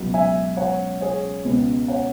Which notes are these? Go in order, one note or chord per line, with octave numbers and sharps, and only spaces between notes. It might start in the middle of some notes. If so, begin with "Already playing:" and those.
Already playing: C#2 B2 F#3
E5 G#5
C#5 F#5
G#4 C#5
C#2 B2 B3
C#5 F#5